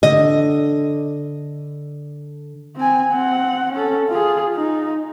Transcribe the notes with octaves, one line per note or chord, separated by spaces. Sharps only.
D3 D#5
C4 G#5
C4 F#5
C#4 A4
F4 G#4
D#4